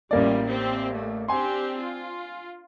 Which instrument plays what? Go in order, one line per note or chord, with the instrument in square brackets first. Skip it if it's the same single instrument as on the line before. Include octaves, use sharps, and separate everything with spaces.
[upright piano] A1 A#3 D5 [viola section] G3 F4
[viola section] C4 G4
A3
[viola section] C4 D4 G4 [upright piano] G#5 C6
[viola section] F4